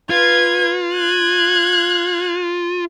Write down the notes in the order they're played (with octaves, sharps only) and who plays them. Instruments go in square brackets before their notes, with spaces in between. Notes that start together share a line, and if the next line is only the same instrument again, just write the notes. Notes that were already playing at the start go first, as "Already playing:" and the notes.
[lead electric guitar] F4 [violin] B4 G#6
[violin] F#6 G#6